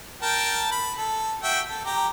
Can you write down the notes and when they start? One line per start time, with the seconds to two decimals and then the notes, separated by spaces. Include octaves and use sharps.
0.22 A#4 G5 A5
0.71 B5
0.98 A4
1.43 F#4 E5 G5
1.69 A4
1.85 G4 A#5